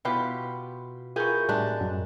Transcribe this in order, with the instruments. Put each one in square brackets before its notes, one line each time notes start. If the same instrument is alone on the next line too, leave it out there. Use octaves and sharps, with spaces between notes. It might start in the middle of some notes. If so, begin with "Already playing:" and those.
[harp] B2 F4 B4 [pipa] E4 G4
[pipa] E3 G4 [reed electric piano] F4 C#6 [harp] G#4 A#4 G6
[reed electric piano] A2 G3 [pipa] C3 G#3 D4 [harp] F#6
[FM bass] F#2